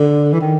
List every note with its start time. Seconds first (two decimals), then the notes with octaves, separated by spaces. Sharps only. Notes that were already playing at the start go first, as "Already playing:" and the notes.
Already playing: D3
0.33 E3
0.41 D#3